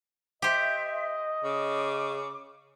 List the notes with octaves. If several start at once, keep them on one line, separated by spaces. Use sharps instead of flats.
G4 C5 D#5 E5
C#3 D6